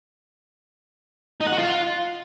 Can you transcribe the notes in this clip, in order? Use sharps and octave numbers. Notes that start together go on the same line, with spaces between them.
D#4
F#5
F#4
F4